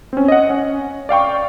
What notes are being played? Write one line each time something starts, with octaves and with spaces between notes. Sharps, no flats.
C4 C#4
D#5 F#5
C#4
D5 F5 G5 C#6